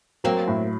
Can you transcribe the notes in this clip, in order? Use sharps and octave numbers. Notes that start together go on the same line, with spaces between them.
F#3 A#3 C4
A2